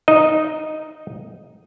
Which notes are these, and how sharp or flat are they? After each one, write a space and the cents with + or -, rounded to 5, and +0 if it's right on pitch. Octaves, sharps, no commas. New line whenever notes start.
D#4 +0 D#5 +0